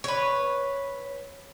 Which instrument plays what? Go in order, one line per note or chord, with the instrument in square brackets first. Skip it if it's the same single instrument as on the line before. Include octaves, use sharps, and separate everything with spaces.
[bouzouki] B4 C#5